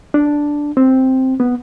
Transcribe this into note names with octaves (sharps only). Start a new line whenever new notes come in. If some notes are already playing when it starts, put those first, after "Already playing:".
D4
C4
B3